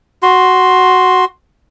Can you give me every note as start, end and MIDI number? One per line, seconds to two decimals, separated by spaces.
0.23 1.25 66
0.23 1.25 84